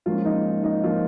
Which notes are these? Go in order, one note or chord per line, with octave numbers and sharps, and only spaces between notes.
G#2 F3 A#3 C#4 F4
D#4
D#4
F3 A#3 C#4 F4